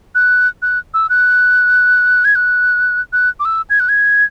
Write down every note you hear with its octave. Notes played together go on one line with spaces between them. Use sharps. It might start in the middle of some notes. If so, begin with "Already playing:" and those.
F#6
F#6
E6
F#6
G#6
F#6
F#6
D6
E6
G#6
F#6
G#6